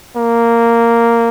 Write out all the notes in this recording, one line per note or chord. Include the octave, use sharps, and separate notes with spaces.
A#3